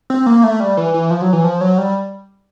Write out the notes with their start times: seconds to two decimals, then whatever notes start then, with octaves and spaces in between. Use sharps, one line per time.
0.10 C4
0.26 A#3
0.44 A3
0.60 G3
0.77 E3
0.94 E3
1.10 F3
1.22 F#3
1.33 E3
1.44 F3
1.61 F#3
1.78 G3